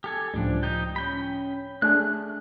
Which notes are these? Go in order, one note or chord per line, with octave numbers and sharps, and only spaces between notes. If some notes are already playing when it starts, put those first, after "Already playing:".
G4 A4 G#5
C#2 A2 F3 G3 D4
D#4 G4 G5
C#4 G5 B5
A3 D4 G#4 F#6